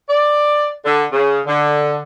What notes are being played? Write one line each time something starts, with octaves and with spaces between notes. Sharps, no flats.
D5
D3
C#3
D3